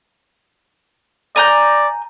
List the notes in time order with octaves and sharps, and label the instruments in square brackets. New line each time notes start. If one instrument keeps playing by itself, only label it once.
[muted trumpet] D5 [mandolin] G#5 A#5 G6